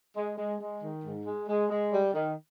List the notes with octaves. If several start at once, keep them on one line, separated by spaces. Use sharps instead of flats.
G#3
G#3
G#3
D#3
G#2
G#3
G#3
G#3
G3
D#3